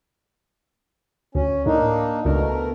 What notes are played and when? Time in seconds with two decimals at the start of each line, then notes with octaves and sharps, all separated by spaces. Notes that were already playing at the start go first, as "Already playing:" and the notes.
1.35 D2 C#4
1.66 A2 A#3 D4 D#4
2.25 C#2 B2 A3 D4 A#4